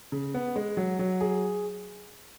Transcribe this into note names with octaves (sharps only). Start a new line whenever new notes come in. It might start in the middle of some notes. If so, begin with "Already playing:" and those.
C#3
B3
G#3
F#3
F#3
G#4